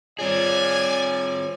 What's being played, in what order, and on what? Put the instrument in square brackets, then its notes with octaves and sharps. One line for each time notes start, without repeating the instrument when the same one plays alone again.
[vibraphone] G3 F4 C#5 [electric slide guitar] C4 G#4 [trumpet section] D5 G#5